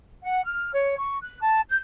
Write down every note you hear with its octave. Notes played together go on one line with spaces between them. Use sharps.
F#5
F6
C#5
C#6
F#6
A5
G6